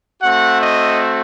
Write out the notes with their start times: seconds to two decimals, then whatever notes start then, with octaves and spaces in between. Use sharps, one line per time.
0.21 A3 C4 F#4 F#5
0.61 D#5